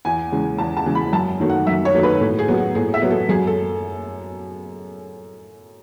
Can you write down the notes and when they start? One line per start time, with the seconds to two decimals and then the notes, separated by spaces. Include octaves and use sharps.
0.05 E2 G#5
0.32 C#3 E3 G#3
0.58 E2 A5
0.77 A5
0.86 C#3 E3 G#3
0.95 B5
1.13 F#2 A5
1.40 D#3 F#3 A3
1.50 F#5
1.67 F#2 E5
1.85 C#5
1.94 D#3 F#3 A3
2.03 B4
2.21 A2
2.39 G#4
2.48 F#3 B3
2.58 F#4
2.75 A2 G#4
2.94 E5
3.02 F#3 B3
3.11 A4
3.29 F#2 G#4
3.47 A4